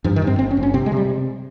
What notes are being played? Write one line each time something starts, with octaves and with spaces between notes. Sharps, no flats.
G2 F3
D#3
G2
C4
G1 C4
C#4
G1
C#4
C3 C4
G#3
C3 G3